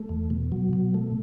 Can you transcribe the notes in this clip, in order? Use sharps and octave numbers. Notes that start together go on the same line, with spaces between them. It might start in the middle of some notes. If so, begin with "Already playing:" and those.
Already playing: A3
E2
B2
F#3
B2
A3